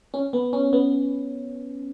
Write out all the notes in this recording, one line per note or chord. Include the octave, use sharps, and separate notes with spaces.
C#4
B3
C#4
B3